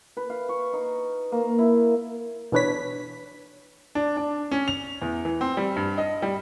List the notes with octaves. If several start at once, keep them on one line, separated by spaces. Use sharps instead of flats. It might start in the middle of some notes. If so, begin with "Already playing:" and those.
B4
F5
C#6
D#4
A#3
E4
B2 E3 D4 B4 C#5 B6
D4
D4
C#4
F7
E2
E3
C4
G3
G2
D#5
G3